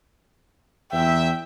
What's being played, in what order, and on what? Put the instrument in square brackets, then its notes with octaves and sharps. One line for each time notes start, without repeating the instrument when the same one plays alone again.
[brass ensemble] E2 E5 [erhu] G5